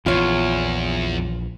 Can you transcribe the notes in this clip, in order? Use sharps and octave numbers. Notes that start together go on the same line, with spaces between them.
A#1 E2 E3 F4 C#5